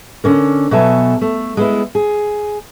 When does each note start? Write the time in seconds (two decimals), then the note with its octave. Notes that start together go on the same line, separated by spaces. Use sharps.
0.24 D3 C#4 A#4
0.71 B2 F#3 A4 E5 G#5
1.21 A3
1.57 G#3 B3 E4
1.95 G#4